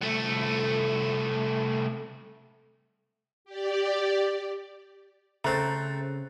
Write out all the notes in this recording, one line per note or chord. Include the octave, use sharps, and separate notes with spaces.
C2 A3
G4 D5
C#3 A3 C4 A#5 F#6 A6